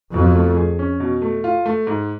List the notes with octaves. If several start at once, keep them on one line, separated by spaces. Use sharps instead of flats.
F2 B2
A3
G#4
C#4
B2
A3
F4
A3
G#2